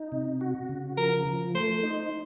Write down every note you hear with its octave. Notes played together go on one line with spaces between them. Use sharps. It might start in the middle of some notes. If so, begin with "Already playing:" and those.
Already playing: D#4
C3
F#4
C#3
F3 A#4
F3
A3 C5
D#4